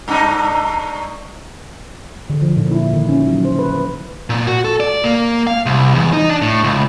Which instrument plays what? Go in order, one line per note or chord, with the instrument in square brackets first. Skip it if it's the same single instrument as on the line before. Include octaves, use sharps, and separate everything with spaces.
[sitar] G2 D4 D#4
[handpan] D3
F3
A#2
E4
D#3
C#4
F#3
C5
B4
B4
[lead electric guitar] A#2
F#4
A4
D5
A#3
F5
C2
E2
D#4
D4
A2
C#2